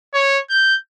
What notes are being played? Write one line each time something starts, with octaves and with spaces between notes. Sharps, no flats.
C#5
G6